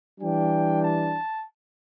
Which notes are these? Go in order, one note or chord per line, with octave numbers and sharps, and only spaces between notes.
E3 G3 D4 G5
A5